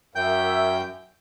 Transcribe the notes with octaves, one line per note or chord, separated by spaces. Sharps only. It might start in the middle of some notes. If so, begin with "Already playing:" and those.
F#2 A#4 C#5 E5 G5 G6